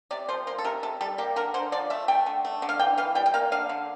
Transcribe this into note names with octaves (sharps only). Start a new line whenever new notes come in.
C3 D5
F3 C5
A#3 C5
A4
C3 A#4
C3 A4
G3 A4
A#3 G4
D3 A#4
D3 C5
F3 D5
A3 E5
A3 G5
D3
A3
D3
F5
E3 G5
E3 F5
G3 G5
G5
A#3 F5
D3 F5
D3